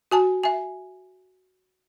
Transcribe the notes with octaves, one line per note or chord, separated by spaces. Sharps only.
F#4 G#5 A5
E5 G#5